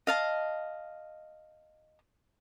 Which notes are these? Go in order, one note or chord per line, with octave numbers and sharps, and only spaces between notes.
D#5 F5 A5